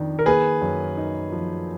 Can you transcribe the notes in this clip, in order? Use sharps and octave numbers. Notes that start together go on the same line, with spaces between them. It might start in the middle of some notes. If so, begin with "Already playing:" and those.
Already playing: F2 D#3 D4
A#4
A#3 G#4 B4
F#2
D#4
F3